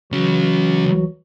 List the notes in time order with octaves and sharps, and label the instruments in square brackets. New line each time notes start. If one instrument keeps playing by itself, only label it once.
[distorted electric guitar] C#2 C#4 [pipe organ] E3 F#3 F#4